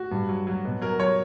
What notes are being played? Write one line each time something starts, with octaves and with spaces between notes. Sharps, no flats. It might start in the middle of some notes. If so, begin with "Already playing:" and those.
Already playing: F#4
G2
F#3
F#3
B2
F#3 A#4
F#3 C#5